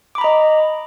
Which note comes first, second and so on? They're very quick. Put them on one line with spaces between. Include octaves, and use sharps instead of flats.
D6 B5 A#5 D#5